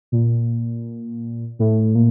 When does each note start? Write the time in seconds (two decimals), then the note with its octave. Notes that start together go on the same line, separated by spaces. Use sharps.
0.12 A#2
1.59 A2
1.95 A#2